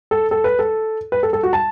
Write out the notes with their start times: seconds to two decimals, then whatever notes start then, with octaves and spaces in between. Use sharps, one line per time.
0.11 A4
0.31 A4
0.44 B4
0.59 A4
1.12 B4
1.23 A4
1.33 A4
1.43 F#4
1.53 A5